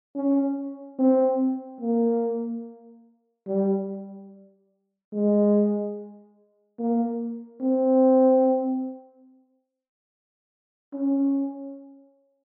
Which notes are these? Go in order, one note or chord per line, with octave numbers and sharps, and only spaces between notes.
C#4
C4
A#3
G3
G#3
A#3
C4
C#4